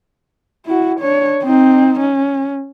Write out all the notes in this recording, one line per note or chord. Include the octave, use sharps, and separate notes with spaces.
E4 F#4
D4 C#5
C4 D#4
C#4